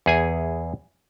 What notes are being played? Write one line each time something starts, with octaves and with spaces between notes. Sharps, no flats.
E2 G#4 G#5